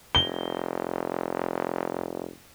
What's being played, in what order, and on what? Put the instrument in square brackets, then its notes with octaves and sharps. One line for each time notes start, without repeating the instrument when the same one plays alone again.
[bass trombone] F1 [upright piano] G7